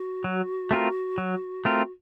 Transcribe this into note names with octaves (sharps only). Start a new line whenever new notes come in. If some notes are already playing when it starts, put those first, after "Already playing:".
Already playing: F#4
F#3
A3 C4 F4 A#4
F#3
A3 C4 F4 A#4